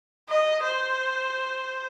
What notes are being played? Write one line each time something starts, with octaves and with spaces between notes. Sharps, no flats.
D#5
C5